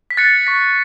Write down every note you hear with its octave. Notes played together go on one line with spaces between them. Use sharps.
B6
F#6 A6 C#7
C#6 B6